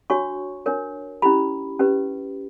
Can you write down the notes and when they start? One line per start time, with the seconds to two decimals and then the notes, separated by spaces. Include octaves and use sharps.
0.10 D4 F#4 C#5 C#6
0.66 D4 A#4 C#5
1.22 C#4 E4 G4 B5
1.79 C#4 G4 B4